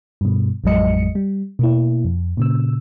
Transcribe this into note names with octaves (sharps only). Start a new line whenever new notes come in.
G2 B2
A1 F2 F#3 G#3 D#5 C#7
G3
B2 A#3 E4
F2
A#2 C#3 E6